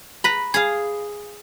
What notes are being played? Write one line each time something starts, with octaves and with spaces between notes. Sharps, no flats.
B4 A#5 B5
G#4 F5